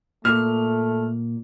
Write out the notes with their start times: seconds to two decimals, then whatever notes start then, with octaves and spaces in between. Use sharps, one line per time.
0.25 A#2 A3 F6